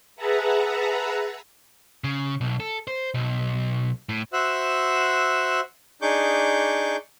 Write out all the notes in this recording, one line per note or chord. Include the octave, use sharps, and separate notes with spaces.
G#4 B4 E5 F#5 A5 A#5
C#3
B1
A4
C5
B1
A2
F#4 C5 E5 E6 F#6
D4 D#4 G#4 C#6 D6 G6